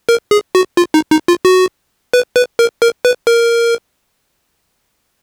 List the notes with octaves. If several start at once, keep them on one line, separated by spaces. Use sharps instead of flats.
A#4
G#4
F#4
F4
D#4
D#4
F4
F#4
B4
B4
A#4
A#4
B4
A#4